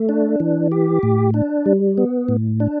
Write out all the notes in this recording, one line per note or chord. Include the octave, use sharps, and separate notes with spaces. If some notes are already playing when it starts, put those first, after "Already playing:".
Already playing: A3
D4
E3
G4
A2
D4
G3
B3
A2
D4